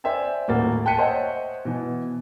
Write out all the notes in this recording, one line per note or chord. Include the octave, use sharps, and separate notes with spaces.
C5 D5 E5 G5 G#5
D#1 A2 A#3 F#4 F#5 A6
G5 A5 F#6 B6 C#7 D#7
C5 C#5 D#5 E5 F#5 G5
B2 E3